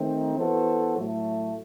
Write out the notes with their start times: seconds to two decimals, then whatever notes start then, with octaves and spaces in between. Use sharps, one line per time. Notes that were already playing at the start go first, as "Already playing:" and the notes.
Already playing: D#3 A3 C4 D#4
0.37 E3 B3 F#4 A4 C5
0.97 A2 F#3 A3